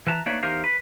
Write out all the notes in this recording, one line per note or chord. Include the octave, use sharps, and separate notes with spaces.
E3 B4 A5 A#5
A3 A#3 D4 D#4 B4 C#5
E2 D#4 G4 A#4 C5 F5
B4